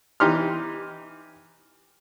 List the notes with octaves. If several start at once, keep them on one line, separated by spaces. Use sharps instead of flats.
E3 D#4 G4 C6 F6